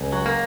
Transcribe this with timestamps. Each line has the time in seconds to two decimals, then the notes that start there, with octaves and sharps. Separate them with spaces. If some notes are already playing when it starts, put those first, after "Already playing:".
Already playing: C#2
0.12 F#3
0.26 A#3